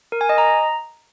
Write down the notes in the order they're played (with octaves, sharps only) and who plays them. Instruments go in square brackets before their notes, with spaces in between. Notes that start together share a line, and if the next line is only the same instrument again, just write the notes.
[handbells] A#4
G#5
D#5
A#5